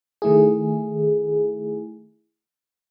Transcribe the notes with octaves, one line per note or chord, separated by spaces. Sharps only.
D#3 A3 E4 G#4